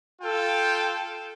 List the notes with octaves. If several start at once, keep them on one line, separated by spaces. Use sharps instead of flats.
F4 A4 G5